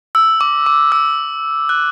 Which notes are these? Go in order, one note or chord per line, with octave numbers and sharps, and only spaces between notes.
E6
D6
D6
E6
F#6